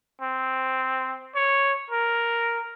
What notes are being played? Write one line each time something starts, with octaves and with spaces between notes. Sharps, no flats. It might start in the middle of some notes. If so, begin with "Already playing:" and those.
C4
C#5
A#4